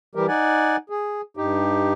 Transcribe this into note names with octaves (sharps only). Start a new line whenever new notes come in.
E3 G3 G4 A#4
D#4 D5 F#5 G#5
G#4
G2 D#4 G4